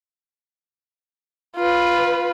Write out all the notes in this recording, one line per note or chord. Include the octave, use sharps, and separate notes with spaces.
F4 B4